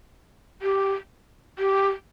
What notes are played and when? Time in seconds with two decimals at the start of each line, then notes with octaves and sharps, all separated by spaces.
0.62 G4
1.59 G4